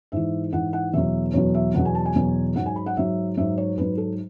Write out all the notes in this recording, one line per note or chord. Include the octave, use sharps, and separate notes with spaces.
G#2 E3 E5
G#2 E3 F#5
F#5
E2 B2 F#3 E5
E2 B2 F#3 C#5
E5
E2 B2 F#3 F#5
G#5
A5
G#5
E2 B2 F#3
G#2 F#3 F#5
G#5
B5
F#5
G#2 F#3 E5
G#2 F#3 E5
C#5
G#2 F#3 B4
A4